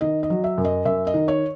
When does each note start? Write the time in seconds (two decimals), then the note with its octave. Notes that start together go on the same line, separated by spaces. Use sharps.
0.01 D#3 D#5
0.23 D#5
0.30 F#3
0.44 E5
0.58 F#2
0.65 D#5
0.85 F#2 E5
1.07 D#5
1.14 D#3
1.28 C#5